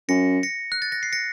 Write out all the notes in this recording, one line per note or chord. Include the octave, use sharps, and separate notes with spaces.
F#2 A#6 C#7
A#6 C#7
F#6
A6
A#6
C7
A#6 C#7